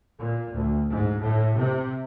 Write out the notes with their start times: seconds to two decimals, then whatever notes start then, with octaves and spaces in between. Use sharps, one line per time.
0.19 A#2
0.55 D2
0.92 G#2
1.23 A2
1.58 C3